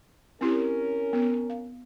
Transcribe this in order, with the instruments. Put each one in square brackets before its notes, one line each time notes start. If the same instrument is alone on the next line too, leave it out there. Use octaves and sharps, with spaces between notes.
[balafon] C4 E4 G4 [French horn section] C#4 A#4
[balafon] B3
F5